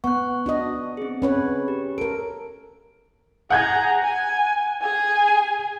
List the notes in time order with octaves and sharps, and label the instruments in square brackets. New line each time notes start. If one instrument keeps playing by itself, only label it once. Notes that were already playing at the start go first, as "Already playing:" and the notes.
[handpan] B3 F#5 [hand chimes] C#6 F#6
[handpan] D4 F#4 D#5
[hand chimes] C4 G#4
[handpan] C#4 B4 C#5
[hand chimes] G4
[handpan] A4 A#4 [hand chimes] D7
[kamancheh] G#4 A#5 [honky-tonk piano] F#5 G6 G#6
[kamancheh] G#5
G#4 G#5